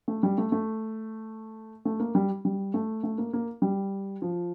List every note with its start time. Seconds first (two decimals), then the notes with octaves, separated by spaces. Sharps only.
0.08 A3
0.23 G3
0.38 A3
0.52 A3
1.85 A3
2.00 A#3
2.15 G3
2.45 G3
2.74 A3
3.03 A3
3.18 A#3
3.33 A#3
3.62 G3
4.22 F3